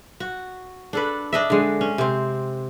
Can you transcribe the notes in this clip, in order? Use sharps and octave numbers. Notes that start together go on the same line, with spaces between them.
F#4
D4 A4 B4
D4 D#5 E5
D3 G#3
C#4
C3 C4